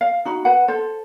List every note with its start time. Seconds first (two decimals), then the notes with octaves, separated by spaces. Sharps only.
0.01 F5
0.25 D#4 F#4 B5
0.45 B4 F#5
0.68 A4 C5